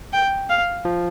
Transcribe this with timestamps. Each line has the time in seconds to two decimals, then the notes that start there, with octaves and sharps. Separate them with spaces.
0.13 G5
0.49 F5
0.85 F3